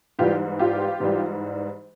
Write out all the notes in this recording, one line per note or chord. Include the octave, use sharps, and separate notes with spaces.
G#2 E3 G3 F4 G4
F4 G4
G#2 E3 G3